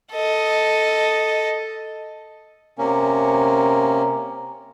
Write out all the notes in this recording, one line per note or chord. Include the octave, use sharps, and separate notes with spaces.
A4 D#5
C3 A#3 C#4